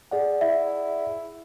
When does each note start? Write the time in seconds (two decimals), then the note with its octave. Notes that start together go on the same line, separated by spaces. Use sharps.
0.11 G#4 D5 F#5
0.41 E4 E5